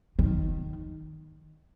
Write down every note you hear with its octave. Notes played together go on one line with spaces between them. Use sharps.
D#3